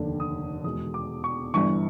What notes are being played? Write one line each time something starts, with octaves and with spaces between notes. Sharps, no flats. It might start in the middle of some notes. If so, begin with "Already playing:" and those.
Already playing: F1 D#2 D3
D#6
E2 B2 G#3 D#6
D6
C#6
G1 G2 E3 C#6